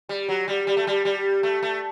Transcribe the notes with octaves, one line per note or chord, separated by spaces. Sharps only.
G3
F#3
G3
G3
A3
G3
G3
A3
A3